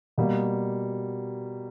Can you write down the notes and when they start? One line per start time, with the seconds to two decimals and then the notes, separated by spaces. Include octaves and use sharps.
0.18 B2 G3 A#3